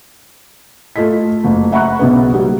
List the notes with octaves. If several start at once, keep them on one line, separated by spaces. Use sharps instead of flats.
A3 F4 A4 D#5 B6
F#1 A3
E5 F#5 A#5 B5 C#6 F#6
B1 C#3 B3
F#3 G3 A#3